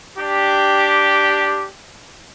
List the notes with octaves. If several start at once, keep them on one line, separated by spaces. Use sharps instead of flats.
D4 G4